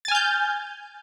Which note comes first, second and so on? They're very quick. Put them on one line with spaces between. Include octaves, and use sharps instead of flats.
A6 G#5 F6 G6